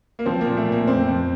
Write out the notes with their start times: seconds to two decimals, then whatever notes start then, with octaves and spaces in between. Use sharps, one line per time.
0.19 A#3
0.26 F3 C4
0.41 A#3
0.46 A#2
0.57 A3
0.68 A#2 A#3
0.87 F2 C4
1.08 F2